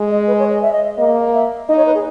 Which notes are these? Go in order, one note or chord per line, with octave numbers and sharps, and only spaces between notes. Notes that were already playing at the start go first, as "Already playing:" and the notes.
Already playing: G#3
D#5
B4
C#5
D#5
E5
D#5
A#3 D#5
E5
D#4 D#5
C#5
B4
G#4